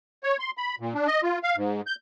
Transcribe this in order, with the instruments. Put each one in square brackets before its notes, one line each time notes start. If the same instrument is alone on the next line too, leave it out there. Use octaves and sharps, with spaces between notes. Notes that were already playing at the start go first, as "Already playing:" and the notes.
[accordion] C#5
C6
B5
A#2
D4
D#5
F4
F5
G#2
G6